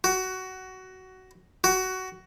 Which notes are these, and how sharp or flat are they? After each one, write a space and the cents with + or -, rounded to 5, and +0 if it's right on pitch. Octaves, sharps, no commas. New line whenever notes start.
F#4 +15
F#4 +15